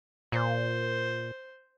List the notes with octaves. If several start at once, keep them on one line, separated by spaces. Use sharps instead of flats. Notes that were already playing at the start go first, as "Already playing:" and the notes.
A#2 C5